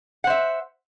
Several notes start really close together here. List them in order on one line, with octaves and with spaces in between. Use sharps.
F#5 C5 E5